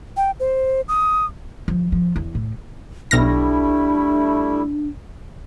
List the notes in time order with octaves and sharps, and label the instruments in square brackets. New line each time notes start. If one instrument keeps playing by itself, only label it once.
[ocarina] G5
C5
D#6
[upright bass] F3
F3
E2
A2
[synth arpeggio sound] B1 F6 A#6 [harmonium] G3 A3 E4 [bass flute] D4